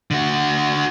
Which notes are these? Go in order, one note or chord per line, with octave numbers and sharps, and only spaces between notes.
D3 F#4